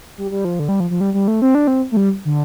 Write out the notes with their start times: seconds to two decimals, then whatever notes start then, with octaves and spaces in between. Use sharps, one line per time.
0.18 G3
0.31 G3
0.45 F3
0.59 D3
0.68 G3
0.80 F3
0.90 F3
1.01 G3
1.14 G3
1.28 A3
1.42 C4
1.55 D4
1.67 C4
1.92 A3
1.97 G3
2.25 D3